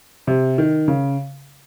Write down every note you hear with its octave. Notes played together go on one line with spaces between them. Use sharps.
C3
D#3
C#3